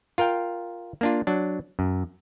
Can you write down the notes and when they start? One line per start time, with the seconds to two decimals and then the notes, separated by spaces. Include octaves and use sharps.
0.18 F4 A#4 F5 G5
1.01 A#3 D4 F4
1.27 F#3 D4
1.79 F#2